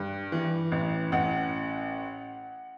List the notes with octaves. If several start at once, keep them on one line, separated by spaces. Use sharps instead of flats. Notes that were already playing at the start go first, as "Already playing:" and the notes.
Already playing: G2
E3
A1
A1 F#5